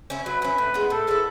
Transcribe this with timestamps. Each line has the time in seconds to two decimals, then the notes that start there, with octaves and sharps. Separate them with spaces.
0.10 C#4 E4
0.26 F#3 B4
0.42 C#4 E4
0.58 A2
0.74 G#3 B3 E4
0.90 A2 A4
1.07 G#3 B3 E4